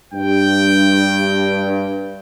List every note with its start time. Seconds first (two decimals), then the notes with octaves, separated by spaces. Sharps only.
0.14 G2 G5